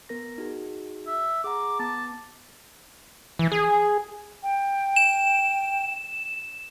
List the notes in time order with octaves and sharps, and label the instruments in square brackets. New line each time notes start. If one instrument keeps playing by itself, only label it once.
[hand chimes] B3 A#4 A#6
D#4 F#4 G#4
[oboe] E5
[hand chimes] G#4 F#5 A#5 [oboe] D6
[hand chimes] B3 D6 [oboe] A5
[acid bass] E3
G#4
[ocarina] G5
[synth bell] E7